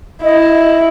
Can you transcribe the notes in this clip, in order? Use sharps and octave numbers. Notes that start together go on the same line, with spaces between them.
E4 D#5